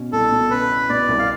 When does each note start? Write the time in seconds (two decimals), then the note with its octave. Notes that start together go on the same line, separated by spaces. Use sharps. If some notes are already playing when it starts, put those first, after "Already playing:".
Already playing: B2 C#4
0.12 C2 A4
0.32 B2
0.51 C#4 B4
0.70 C#4
0.89 B2 D5
1.09 C2
1.19 F5